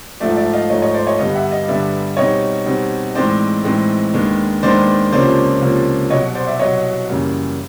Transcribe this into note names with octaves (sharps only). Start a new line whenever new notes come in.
G#2 F3 A3 D5 E5
D5 E5
D#5 F5
G#2 F3 A3 C#5 D#5
C#5 D#5
C5 D5
C#5 D#5
G2 D3 G3 B3 D#5 F5
E5 F#5
D#5 F5
G2 D3 G3 B3 D5 E5
B2 G3 C4 D#4 C#5 D#5
B2 G3 C4 D#4
A2 E3 G#3 C4 D#4 C5 D5
A2 E3 G#3 C4 D#4
D#2 D#3 G#3 B3 D4
D#2 D#3 G#3 B3 D4 C5 D5
C#2 C3 F3 A#3 C#4 C5 D5
C#2 C3 F3 A#3 C#4
C2 B2 F#3 C#5 D#5
C5 D5
D5 E5
C2 B2 F#3 C#5 D#5
F#2 C#3 E3 G3 A#3